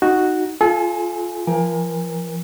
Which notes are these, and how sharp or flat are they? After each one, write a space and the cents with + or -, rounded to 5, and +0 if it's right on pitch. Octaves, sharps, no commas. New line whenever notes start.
D#4 +0 F#4 +0
F4 +0 A4 -35 G#5 +0
F3 -35 A#4 +25 G#5 -30